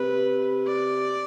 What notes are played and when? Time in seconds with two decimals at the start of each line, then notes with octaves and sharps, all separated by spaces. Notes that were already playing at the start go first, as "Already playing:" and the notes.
Already playing: C3 B4
0.67 D5